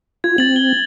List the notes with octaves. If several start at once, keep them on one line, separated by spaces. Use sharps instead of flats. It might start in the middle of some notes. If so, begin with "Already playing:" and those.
F4 G#6
C4 A6 F#7
G7